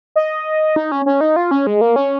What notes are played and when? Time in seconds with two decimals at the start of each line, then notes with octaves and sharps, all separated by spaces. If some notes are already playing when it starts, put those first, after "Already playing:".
0.16 D#5
0.76 D#4
0.92 C#4
1.06 C#4
1.21 D#4
1.36 F4
1.51 C#4
1.67 G#3
1.81 A#3
1.96 C#4